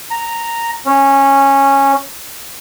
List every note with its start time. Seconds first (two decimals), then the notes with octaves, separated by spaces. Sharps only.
0.11 A#5
0.86 C#4